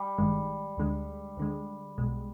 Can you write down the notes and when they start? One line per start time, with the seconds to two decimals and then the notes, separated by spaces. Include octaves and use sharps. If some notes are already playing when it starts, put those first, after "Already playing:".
Already playing: G3
0.18 G#1 G2 D#3 G#3
0.77 D2 D3 G#3
1.37 D2 D3 G#3
1.98 B1 B2 G#3